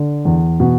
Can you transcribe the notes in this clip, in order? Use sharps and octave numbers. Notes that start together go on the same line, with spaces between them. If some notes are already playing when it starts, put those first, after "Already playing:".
Already playing: D3
E2
B2